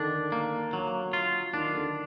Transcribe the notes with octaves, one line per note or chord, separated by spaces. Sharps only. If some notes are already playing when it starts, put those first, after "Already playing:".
Already playing: D3 D#3 D4
A#3
F#3
F4
D#3 D4
D3